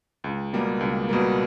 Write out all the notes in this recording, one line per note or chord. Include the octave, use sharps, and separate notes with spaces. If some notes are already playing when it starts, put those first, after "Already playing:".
C#2
B2 G3 A#3
C#2
B2 G3 A#3